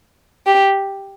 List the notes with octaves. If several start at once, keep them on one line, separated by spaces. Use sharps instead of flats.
G4